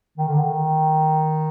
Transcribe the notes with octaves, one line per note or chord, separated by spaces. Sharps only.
D#3
D3
D#3